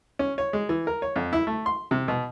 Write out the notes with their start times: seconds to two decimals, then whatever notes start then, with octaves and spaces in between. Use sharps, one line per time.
0.19 C#4
0.38 C#5
0.53 G#3
0.69 E3
0.87 A#4
1.02 C#5
1.16 F2
1.33 E4
1.47 A3
1.66 C6
1.91 C3
2.08 B2